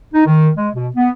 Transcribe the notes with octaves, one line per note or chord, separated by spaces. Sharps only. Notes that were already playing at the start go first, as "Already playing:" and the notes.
D#4
D#3
G#3
B2
B3